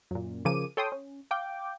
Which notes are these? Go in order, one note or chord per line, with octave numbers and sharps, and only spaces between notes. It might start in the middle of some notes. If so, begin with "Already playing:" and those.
F#2 A#2
C#3 F3 G#4 A#4 D6 D#7
A4 C#5 G5 C6 D#6
C#4
F5 G5 D6